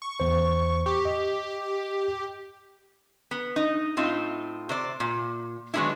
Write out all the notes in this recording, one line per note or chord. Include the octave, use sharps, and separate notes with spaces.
C#6
E2 C5
G4 C#6
D#5
B3
D#4
A2 C4 D#4 F4
C3 C5 D5
A#2
D#3 F#3 G#3 B3 D4 E4